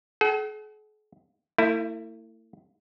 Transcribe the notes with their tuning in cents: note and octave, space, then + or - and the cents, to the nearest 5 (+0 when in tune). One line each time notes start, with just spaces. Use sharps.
G#4 +45 F#5 +45
A3 +45 E4 +0